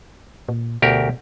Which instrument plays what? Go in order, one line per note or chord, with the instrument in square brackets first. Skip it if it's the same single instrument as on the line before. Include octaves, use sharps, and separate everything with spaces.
[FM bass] A#2
[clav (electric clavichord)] D2 G4 A#4 [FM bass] B2